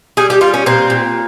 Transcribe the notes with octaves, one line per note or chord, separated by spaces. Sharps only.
G3 G#4
G4
G3 F4
C#4
A#2 C4
A#2